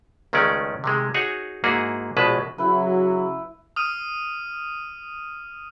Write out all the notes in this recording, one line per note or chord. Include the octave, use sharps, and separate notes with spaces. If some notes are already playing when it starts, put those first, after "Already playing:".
C#2 D#3 G#3 A3 C#4 D5
C3 D#3 G#3
D#4 F#4 G#4 C#5 F#5 G#5
G#2 A#3 E4 F#4 G#4
A#1 B2 G#3 B4 A5
C#3 F#3 E4 B4
D#6 F6 D#7